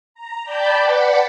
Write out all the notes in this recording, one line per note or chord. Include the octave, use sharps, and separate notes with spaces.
A#5
D5 G5 A5 B5 G6
B4 D5 F#5